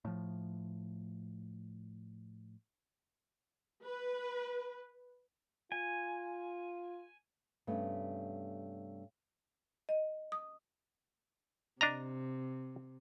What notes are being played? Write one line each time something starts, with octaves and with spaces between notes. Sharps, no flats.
A2 F3
B4
F4 G#5
G2 C3 A3 B3 C#4
D#5
D#6
C3 D4 D#5 A#5